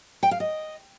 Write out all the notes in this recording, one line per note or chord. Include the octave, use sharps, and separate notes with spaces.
G5
F5
D#5